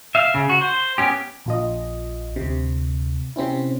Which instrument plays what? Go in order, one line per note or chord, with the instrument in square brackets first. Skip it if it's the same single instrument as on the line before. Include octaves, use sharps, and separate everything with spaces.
[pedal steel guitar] E5 F5
C#3
F#4
C5
B3 C#4 G4
[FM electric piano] A#1 F4 D#5
D2 C3
C3 C4 C#4 E4